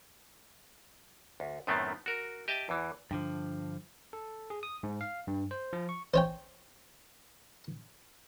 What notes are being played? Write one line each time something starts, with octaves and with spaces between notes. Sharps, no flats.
D2
F#2 A2 D#3 A3 B3 C4
F#4 A#4
G4 D#5 E5 G5 A5
E2 E3
G2 D3 F3
A4
G#4
D#6
G#2
F5
G2
C5
F3
C#6
C5 C#5 G5